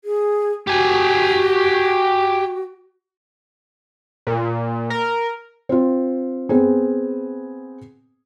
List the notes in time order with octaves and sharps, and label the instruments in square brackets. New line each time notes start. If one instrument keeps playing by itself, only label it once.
[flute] G#4
[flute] F#4 [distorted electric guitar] G4 G#5
[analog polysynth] A#2
A#4
[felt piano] C4 F4
B3 C4 G#4